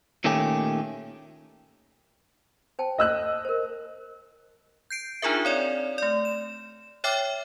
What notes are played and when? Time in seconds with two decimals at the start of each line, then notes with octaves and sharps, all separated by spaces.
0.24 A#2 D#3 A3 C#4 G4
2.79 C5 G5 A5
2.98 D#5 E6 F#6
3.45 A#4 C5
4.90 G6 C7 D7
5.22 D4 D#4 F4 G#4 A#4 E5
5.45 C4 C#5 D5
5.98 A3 D5
6.25 E7
7.04 C#5 E5 G5 D6 F6